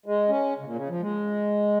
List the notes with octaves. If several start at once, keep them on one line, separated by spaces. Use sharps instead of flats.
G#3
C#4
C#3
A#2
C#3
F3
G#3